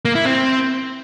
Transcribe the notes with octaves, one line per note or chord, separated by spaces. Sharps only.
A#3
E4
C4